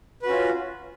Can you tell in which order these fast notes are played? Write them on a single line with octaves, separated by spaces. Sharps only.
B4 F#4 C#4 F4